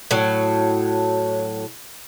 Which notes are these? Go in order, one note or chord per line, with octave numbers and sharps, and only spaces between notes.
A2 F#3